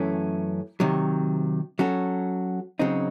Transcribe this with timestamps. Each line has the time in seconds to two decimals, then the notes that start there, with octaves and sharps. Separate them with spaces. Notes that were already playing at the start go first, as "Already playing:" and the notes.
Already playing: F#2 E3 A3 C#4
0.80 C3 D#3 F#3
1.79 F#3 C#4 F#4 A4
2.79 C#3 F#3 C4 D#4